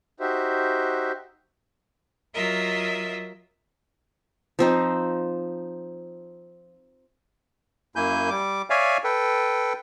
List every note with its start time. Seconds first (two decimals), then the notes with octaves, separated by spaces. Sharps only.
0.20 D#4 F#4 G4 C5 E5
2.34 F#3 F4 A#4 D#5 E5
4.59 F3 C4 D#4
7.96 F#2 A#3 E4 G#5 G6
8.30 G3 D6
8.70 C#5 D5 E5 F5 G#5
9.04 A4 B4 G5